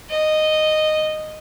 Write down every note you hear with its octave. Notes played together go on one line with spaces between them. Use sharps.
D#5